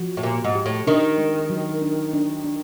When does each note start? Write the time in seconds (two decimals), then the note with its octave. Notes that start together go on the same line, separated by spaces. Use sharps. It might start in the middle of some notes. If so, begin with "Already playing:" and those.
Already playing: F3 F#4
0.17 A2
0.23 A#2 G4
0.44 G#2
0.55 G4
0.66 A2
0.87 D#3 D4
1.18 G#3
1.50 F#3
1.82 D4
2.13 D4
2.44 D4